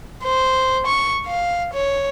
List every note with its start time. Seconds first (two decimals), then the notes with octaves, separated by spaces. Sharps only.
0.24 C5
0.87 C#6
1.27 F5
1.73 C#5